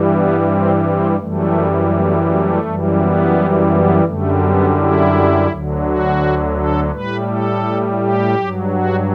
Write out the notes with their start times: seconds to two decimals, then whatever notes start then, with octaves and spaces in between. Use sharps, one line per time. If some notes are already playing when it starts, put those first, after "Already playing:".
Already playing: G2 E3 G3
0.11 B3
0.47 C4
0.82 C4
1.18 F#2 E3 G3 A3
1.90 A3
2.25 A3
2.62 F#2 E3 G3
2.97 B3
3.69 B3
4.04 F#2 D3 G3 A3
4.41 B3
4.77 E4
5.49 D2 D3 F#3
5.84 F#4
6.55 A4
6.91 A2 G3 B4
7.27 A4
7.99 G4
8.34 G2 F#3
8.71 F#4